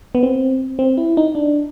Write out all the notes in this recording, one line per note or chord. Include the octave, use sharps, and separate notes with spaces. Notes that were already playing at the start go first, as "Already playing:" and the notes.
B3
C4
C4
E4
D#4
D4